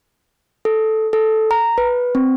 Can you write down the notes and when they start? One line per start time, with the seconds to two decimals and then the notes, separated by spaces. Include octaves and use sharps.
0.65 A4
1.13 A4
1.51 A#5
1.78 B4
2.15 C4